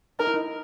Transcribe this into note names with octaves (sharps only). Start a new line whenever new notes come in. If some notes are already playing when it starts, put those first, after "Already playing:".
D#4 A#4
E4
D#4